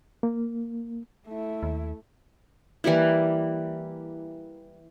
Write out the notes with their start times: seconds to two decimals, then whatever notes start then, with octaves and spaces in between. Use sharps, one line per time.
0.23 A#3
1.28 A3 E4
1.63 D#2
2.84 E3 G3 A#3 E4